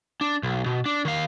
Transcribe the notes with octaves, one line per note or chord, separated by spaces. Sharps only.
D4
B1
B2
D4
D#3 F5